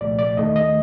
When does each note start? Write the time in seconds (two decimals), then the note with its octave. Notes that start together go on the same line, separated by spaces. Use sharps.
0.01 C2 A#2 F3 A3 D5
0.19 D5
0.37 D#2 D#3 A3 D#5
0.56 D#5